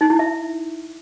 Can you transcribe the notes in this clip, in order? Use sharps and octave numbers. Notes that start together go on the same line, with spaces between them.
D#4
E4
E5